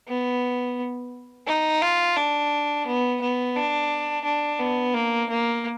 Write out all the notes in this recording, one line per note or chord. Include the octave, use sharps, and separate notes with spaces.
B3
D#4
F4
D4
B3
B3
D4
D4
B3
A#3
A#3